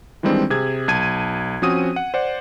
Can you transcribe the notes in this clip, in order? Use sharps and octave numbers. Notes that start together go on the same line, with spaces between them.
D#3 E3 G3 G#3 C4 D4
C3 G#4 G#6
B1 A5 G#6 D#7
F3 C4 C#4 F#4 D#6 D#7
F#5
C5 D5 F#5